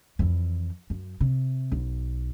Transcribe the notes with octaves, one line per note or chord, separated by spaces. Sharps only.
F2 E3
F#2
C3
B1